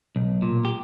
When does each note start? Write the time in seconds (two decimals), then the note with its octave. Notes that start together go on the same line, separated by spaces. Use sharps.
0.16 B1
0.42 A#2
0.65 G4